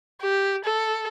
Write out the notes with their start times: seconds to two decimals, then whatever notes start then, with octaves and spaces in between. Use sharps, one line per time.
0.21 G4
0.65 A4